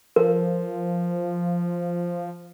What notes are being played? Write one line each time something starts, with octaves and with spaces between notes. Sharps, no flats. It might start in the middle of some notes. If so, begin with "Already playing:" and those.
F3 A#4